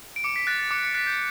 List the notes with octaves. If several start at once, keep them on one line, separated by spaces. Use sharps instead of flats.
D7
D6 C#7
B6
F#6 A6
A6
D6 C#7
C#7
F#6 B6
G6